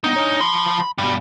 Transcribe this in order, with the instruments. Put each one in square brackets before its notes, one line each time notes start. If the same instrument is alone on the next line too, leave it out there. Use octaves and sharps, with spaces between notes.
[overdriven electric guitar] B3 D4 [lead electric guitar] D#4
[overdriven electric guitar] D4 C#5
[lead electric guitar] F3 C6 [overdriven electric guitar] B5
[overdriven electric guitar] G2 B2 [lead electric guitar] G3